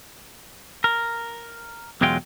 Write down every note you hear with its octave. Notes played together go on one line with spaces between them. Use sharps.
A#4
B1 E2 F#3 G#3 F4 G5